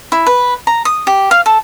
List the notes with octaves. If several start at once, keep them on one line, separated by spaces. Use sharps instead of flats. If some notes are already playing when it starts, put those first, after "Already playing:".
E4
B4
A#5
D#6
G4
F5
A4